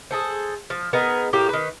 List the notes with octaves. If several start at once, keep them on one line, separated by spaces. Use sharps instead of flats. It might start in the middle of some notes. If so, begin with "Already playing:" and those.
G#4 A4 C5
F3
B3 D#4 G#4 A#4
A2 A#3 G4
D#3 B4